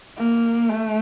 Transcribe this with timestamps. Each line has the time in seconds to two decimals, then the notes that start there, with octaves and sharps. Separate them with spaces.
0.17 A#3
0.69 A3